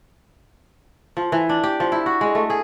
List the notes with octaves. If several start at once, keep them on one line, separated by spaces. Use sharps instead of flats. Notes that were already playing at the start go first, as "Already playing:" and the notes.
F3
E3
D4
G4
F3
E4
F#4
G#3
A3
G#4